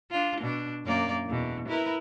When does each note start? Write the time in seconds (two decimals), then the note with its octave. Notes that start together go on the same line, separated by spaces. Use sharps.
0.11 D4 F4
0.40 B2 D4
0.85 F#2 A#3 D5
1.26 E2 B2
1.68 E4 A#4 B4